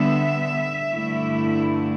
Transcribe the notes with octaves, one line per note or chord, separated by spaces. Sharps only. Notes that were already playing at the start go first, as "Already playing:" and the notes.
Already playing: D3 G3 B3 E5
G2 D3 A3 E4